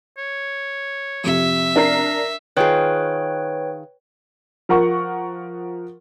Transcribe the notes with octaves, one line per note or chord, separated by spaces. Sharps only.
C#5
F2 C3 E5
D4 A#4 A#5 C7
D#3 F4 G#4 B4 C#5 G5
F3 A#4 F#5 C#6